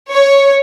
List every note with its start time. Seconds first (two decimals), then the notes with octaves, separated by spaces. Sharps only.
0.13 C#5